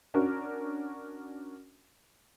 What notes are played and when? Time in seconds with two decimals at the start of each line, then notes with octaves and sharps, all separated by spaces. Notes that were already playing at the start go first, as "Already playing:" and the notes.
0.14 C#4 D4 F#4 A#4